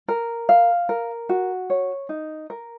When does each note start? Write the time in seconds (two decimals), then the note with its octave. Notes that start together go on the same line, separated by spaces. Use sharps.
0.08 A#4
0.49 F5
0.89 A#4
1.29 F#4
1.70 C#5
2.09 D#4
2.50 A#4